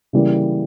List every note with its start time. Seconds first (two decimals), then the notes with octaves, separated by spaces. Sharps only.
0.13 C#3 E3 G3 A#3